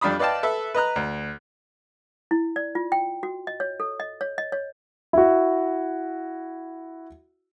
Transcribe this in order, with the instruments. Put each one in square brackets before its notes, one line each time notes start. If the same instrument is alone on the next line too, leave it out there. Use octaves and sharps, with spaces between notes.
[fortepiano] F2 G3 D4 F5 B5 D#6
B4 D5 D#5 F5 G5 A5
A4 B4 E5
B4 D#5 A#5 F#6
D2
[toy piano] E4
D5
F4
G5
F#4
D#5
C#5
A4
D#5
C#5
D#5
C#5
[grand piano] E4 F#4